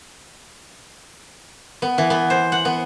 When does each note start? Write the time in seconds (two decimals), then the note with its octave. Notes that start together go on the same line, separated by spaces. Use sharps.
1.82 B3
1.98 E3
2.10 B3
2.30 C5
2.52 F#5
2.65 B3